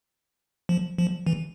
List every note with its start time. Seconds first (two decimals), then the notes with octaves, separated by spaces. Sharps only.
0.69 F3
0.98 F3
1.27 E3